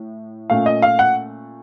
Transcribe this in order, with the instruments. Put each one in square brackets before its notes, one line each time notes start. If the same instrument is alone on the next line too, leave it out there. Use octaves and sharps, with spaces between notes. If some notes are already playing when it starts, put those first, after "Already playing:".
Already playing: [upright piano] A2
A#2 A3 C#4 F5
D#5
F5
F#5